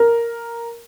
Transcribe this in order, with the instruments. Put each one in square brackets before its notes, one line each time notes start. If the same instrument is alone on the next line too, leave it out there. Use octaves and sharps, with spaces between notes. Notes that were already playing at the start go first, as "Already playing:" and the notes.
Already playing: [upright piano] A#4